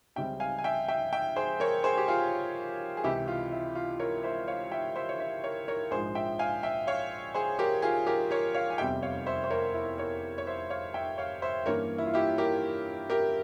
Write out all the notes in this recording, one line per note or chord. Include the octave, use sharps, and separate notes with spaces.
C#2 C#3 G3 C4 E5 G5
F5 G#5
G#5
E5 G5
E5 G5
E5 G5
G#4 C5
A#4 C#5
G#4 C5
G4
F4 G#4
G#4
C#2 C3 E3 E4 G4
F4
E4
F4
A#4 C#5
C5 E5
C#5 F5
E5 G5
C5 E5
C#5
C5 E5
A#4 C#5
A#4 C#5
A#1 G#2 F3 G#3 G#4 C5
E5 G5
F5 G#5
E5 G5
C#5 F5
G#4 C5
G4 A#4
F4 G#4
G4 A#4
A#4 C#5
C#5 F5
G#5
F1 E2 C3 G3 C4 E5 G5
C#5 F5
C5 E5
C5
A#4 C#5
E4
A#4 C#5
C#5
C5 E5
C#5 F5
E5 G5
C#5 F5
C5 E5
G2 E3 A#3 C#4 A#4 C#5
E4
F4
E4 G4
G4 A#4
G4 A#4